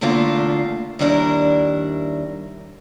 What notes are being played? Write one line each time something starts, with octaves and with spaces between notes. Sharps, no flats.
E2 A2 D3 A3 A#3 F4
D#2 D#3 G3 D4 E4 A#4